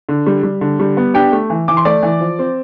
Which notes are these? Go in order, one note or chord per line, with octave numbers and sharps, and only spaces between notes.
D3
G3
G3
D3
G3
B3
D4 G4 G5
A3
E3
E3 D6
C6
A3 D5 D6
E3
F3
C4